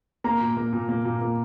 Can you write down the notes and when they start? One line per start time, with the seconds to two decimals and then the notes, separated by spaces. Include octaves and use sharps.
0.24 A#3 A#5
0.41 A#2
0.57 A#3
0.73 A#2
0.89 A#3
1.05 A#2
1.21 A#3